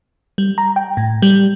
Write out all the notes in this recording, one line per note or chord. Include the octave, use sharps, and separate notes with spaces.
G3
A#5
G5
A2
G3